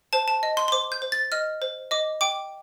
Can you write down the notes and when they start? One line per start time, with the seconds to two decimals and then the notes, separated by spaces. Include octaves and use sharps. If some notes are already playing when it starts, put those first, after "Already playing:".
0.13 C5 A5
0.28 A5
0.43 D#5
0.57 C6
0.68 C6
0.72 C5 D6
0.92 G6
1.02 C5
1.12 A6
1.32 D#5 F6
1.62 C5
1.91 D#5 D6
2.21 G5 D6